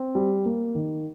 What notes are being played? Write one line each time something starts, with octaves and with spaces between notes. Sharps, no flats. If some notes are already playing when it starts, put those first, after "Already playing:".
Already playing: C4
G3
A#3
D#3